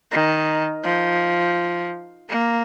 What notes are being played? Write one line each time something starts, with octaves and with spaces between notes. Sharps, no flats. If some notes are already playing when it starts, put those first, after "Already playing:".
D#3
F3
A#3